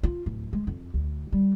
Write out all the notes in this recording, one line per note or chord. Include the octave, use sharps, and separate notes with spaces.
F4
D1
G#3
F2
D2
G3